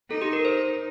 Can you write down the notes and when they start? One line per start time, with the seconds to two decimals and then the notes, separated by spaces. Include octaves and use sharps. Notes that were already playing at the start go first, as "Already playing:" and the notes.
0.10 D#4 A4
0.22 G4
0.33 A#4
0.45 C5